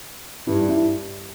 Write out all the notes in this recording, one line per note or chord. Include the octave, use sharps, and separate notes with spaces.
G2 E4
E4